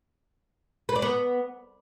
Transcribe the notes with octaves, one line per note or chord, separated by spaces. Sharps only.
B4
D5
B3